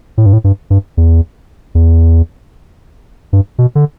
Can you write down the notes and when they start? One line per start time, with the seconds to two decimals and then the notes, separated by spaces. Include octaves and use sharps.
0.18 A2
0.26 G2
0.33 A2
0.44 G2
0.70 G2
0.97 E2
1.75 E2
3.33 G2
3.58 B2
3.75 D3